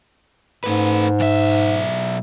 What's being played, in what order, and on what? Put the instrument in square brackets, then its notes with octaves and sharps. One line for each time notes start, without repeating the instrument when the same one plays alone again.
[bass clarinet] G#2 [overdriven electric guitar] A3 B4
[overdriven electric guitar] B1 E5